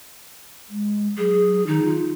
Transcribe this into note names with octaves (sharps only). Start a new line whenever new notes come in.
G#3
F#3 G#4
D#3 D#4
F4